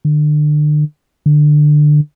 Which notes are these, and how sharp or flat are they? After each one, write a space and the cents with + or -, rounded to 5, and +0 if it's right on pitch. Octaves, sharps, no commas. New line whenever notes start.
D3 +35
D3 +20